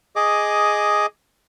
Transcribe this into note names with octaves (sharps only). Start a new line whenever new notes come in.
G#4 D#5 D6